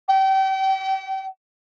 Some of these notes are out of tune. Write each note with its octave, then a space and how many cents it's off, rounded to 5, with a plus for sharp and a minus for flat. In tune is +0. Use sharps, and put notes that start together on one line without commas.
G5 -35